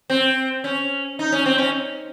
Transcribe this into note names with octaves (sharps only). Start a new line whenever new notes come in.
C4
C#4
D#4
C#4
C4
C#4